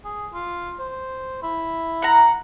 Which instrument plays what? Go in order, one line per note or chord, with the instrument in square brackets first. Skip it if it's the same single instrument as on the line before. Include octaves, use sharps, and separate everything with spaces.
[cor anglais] G#4
F4
C5
E4
[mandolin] F#5 A#5